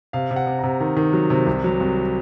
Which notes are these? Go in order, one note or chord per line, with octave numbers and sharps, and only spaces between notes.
C3 F5
C3
F#5
C3
C3 A#5
D#3
D#3
F#3
C3
C2
F#3
C2